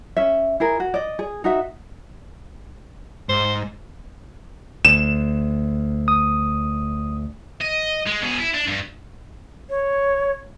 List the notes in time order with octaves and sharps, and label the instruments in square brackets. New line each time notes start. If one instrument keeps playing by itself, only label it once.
[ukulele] C#4 E5
E4 G#4 A#4
F#4
D5 D#5
G#4
D#4 F#4 E5
[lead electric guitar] G#2 [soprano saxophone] C5
[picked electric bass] D2 [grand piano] E7
[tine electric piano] D#6
[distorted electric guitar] D#5
G#3
B2 G#4
E4
D4
G2
[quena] C#5